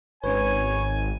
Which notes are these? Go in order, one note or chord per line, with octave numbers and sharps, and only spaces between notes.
G#1 C#4 B4 C#5 G#5